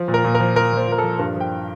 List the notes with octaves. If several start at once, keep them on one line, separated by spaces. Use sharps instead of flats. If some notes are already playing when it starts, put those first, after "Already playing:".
Already playing: F3
A#2
A#4
A#2
A#4
F3
F3 A#4
A#2 C5
A#2 A#4
A4
F3
G2 A#4
F3 G5